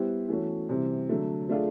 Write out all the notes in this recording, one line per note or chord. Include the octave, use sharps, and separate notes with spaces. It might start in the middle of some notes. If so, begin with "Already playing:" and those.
Already playing: G3 B3 E4 G4 C5
E3 A3 C#4 F#4
C3 E3 G3 C4
D3 F#3 A3
A3 D4 F4 G#4